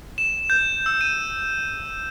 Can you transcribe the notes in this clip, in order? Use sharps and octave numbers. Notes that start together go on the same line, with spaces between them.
E7
G6
E6
D#7